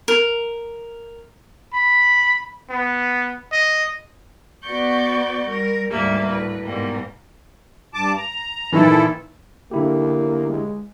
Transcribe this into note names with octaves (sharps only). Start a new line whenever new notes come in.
A#4
B5
B3
D#5
B3 F#4 D5 C#6 D6 G6
G3 A#4
D2 G#2 G3 A#3 E5
A2 B4
G#2 B2 G3 A#3
G2 A5 D6
A#5
A#2 D#3 E3 E4 A4
D3 A#3 E4 G4
G#3